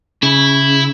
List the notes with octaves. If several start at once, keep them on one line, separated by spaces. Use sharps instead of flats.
C#3 E4